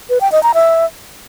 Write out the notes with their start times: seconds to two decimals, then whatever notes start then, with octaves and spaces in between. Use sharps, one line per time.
0.10 B4
0.21 G5
0.32 D#5
0.43 A#5
0.54 E5